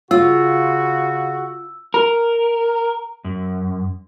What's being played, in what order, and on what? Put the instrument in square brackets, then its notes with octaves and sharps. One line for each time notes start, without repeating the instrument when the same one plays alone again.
[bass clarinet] C#3 [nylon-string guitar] F4 [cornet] F#4 [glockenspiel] E6
[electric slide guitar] A#4
F#2